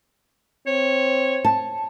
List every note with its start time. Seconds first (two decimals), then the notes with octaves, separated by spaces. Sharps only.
0.67 C4 C#5
1.45 A5